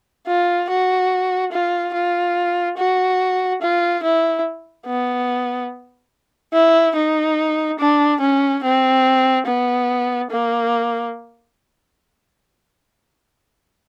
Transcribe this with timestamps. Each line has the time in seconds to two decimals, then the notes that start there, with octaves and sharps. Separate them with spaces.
0.27 F4
0.69 F#4
1.52 F4
1.93 F4
2.78 F#4
3.62 F4
4.03 E4
4.86 B3
6.53 E4
6.96 D#4
7.79 D4
8.20 C#4
8.63 C4
9.46 B3
10.30 A#3